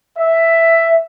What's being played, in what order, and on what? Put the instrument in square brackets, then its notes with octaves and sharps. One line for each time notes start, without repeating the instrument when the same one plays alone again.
[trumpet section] E5